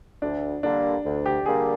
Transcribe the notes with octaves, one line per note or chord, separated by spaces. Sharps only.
D2 D4
D3 G3 A#3 D4
D2
G4
D3 G3 A#3 G#4